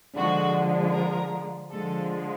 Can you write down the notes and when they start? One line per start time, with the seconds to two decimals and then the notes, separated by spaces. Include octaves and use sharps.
0.15 D3 F3 G#3 F#4
0.93 A#4
1.71 D3 F3 G#3 A4